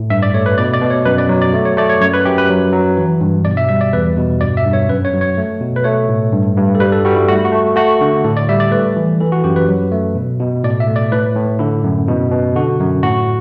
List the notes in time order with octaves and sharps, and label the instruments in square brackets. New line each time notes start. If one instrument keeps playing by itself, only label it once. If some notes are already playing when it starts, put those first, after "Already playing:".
Already playing: [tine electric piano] A2
G2 E5
D5
A3 C#5
B4
B2 D5
D5
B2
C#5
F#2 B4
D5
F#3
D5
A3
C#5
A3 D5
C#5
F#2 C#5
B4
F#2 G4
B4
F#3
F#3
E3
G2
B2 D5
E5
G3 E5
D5
E2 B4
B2
G2 D5
E5
G2
C#5
F#2 B4
C#5
F#3
C#5
A3
B2
B4
A3 C#5
A2
G2
G2
A4
G3 B4
A4
G3 F#4
E4
A3 F#4
F#4
A3
A3 F#4
D3
A2 A4
D5
G3 E5
D5
A3 B4
E3
E3 A4
F#4
F#2 G4
B4
F#3
A3
B2
B2
A2 D5
E5
A3
D5
A2 B4
A2
D3 E4
F#2
B2
B2
D3 F#4
F#2
A2 F#4